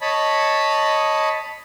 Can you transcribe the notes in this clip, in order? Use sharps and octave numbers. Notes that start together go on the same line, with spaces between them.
C#5 D#5 A5 B5